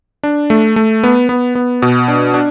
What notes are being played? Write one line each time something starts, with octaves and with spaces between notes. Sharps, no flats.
D4
A3
A3
B3
B3
B3
B2
D4
D4